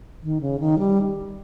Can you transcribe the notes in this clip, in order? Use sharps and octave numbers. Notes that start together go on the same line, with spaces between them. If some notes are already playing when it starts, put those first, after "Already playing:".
D#3
C#3
D#3
G3